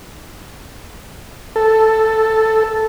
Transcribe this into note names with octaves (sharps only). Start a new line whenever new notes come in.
A4